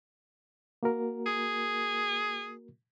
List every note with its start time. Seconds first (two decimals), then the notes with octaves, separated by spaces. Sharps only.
0.83 A#3 F#4 A#4
1.26 G#4